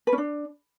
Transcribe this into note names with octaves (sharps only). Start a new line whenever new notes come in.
B4
C#4
D4